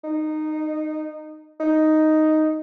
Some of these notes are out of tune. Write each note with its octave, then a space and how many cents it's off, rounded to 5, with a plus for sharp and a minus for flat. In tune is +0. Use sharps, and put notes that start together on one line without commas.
D#4 -15
D#4 +0